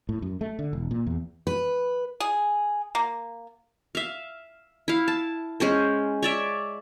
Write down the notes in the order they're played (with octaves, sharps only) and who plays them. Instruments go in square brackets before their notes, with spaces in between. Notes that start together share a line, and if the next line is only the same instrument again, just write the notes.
[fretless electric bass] A2
F#2
A3
D3
E1
A#2
E2
[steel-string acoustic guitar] B4
[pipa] G#4
A#3
[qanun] E5 F5
E4 F5
A5
G#3 C#4 C5
C#5 D5 E5